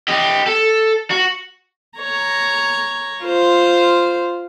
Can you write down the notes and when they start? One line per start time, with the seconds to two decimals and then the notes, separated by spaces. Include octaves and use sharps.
0.08 G4 D#5
0.46 A4
1.10 F#4
1.99 C#5 A#5
3.23 F4 C5